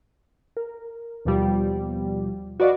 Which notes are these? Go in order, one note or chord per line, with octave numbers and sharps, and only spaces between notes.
A#4
D#2 B2 F3 G3
F#4 B4 D5 D#5 F5